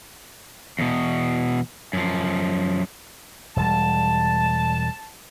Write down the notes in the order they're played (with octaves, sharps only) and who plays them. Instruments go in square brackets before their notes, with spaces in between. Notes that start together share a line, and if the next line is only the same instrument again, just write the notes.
[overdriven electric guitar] E2 B2
F#2 F3
[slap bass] E1 G3 [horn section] A5